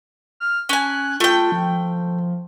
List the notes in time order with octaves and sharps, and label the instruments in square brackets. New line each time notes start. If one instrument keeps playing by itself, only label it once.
[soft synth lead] F6
[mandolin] C#4 G#5 [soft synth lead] F#6
[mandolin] A3 G5 [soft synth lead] F4
[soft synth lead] F3